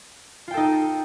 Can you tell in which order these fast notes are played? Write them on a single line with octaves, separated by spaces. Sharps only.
F4 G5 A4 D#4